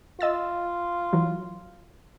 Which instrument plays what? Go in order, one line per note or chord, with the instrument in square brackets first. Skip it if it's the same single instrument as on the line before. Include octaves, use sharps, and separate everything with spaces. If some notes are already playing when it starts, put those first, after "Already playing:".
[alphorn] F4 [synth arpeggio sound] D#5 E6 A6
[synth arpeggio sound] E3 F#3